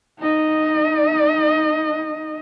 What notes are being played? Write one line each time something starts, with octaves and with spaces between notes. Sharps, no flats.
D#4 D#5